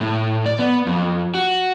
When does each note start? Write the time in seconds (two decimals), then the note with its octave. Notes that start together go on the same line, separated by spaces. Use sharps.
0.01 A2
0.46 D5
0.59 B3
0.86 F2
1.35 F#4